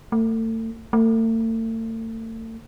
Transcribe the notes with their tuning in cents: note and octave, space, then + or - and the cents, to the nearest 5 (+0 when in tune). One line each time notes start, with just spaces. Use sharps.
A3 +35
A3 +40